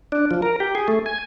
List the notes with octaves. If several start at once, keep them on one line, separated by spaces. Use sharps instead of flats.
D4
F3
A#4
G4
G#4
A3
G#5